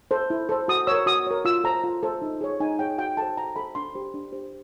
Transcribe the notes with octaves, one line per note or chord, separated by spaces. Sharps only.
A4 C5
E4
A4 C5
F#4 D#6
A#4 C#5 E6
F#4 D#6
A#4 C#5
F4 E6
A4 C5 A#5
F4
A4 C5
D#4
G#4 C#5
D#4 G#5
G#4 C#5 G5
F#4 G5
A4 C5 A5
F#4 A#5
A4 C5 B5
D4 C6
G4 C5
D4
G4 C5